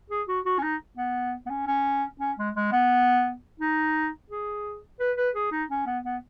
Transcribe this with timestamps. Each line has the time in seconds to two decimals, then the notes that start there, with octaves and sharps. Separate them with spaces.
0.10 G#4
0.28 F#4
0.45 F#4
0.58 C#4
0.63 D#4
0.97 B3
1.46 B3
1.50 C#4
1.67 C#4
2.20 C#4
2.38 G#3
2.55 G#3
2.72 B3
3.60 D#4
4.30 G#4
5.00 B4
5.17 B4
5.35 G#4
5.52 D#4
5.70 C#4
5.86 B3
6.05 B3